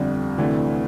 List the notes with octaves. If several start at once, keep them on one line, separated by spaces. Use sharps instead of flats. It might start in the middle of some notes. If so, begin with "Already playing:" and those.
Already playing: G1 F2 D3 G3
D2 C3 E3 A3 D4